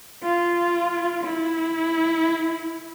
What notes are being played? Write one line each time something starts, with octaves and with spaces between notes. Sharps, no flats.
F4
E4